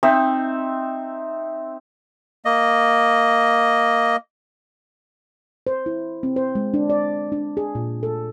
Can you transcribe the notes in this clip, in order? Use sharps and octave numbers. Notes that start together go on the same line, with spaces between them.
C4 D#4 E5
A#3 D#5
C5
E4
C4
C5
G#3
D4
D5
D4
G#4
A#2
A4